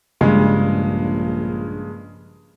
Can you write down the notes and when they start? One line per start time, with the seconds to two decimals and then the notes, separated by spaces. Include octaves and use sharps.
0.21 A#1 G2 C#3 G#3